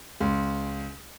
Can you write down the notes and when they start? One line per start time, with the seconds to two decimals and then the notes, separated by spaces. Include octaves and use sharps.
0.20 C#2